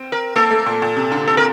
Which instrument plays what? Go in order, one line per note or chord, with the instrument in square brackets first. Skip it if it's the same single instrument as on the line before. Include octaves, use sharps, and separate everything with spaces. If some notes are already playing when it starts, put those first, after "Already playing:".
Already playing: [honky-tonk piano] C4
[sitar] A#4
[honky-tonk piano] A#3 [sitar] A4
[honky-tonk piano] A3
A#2
A#2
C3
D3
[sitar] A4
A#4